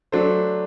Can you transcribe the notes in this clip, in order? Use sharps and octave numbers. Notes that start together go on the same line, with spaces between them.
F#3 A3 D4 A4 C5